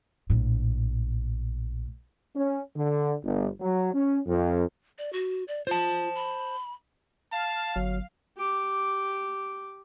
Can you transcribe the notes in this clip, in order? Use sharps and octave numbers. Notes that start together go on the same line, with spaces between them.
A#1 A2
C#4
D3
G1
F#3
C#4
F2
D5
F#4
D5
F4 C5 A5
B5
F5 A5
G1 F#3
G4 D6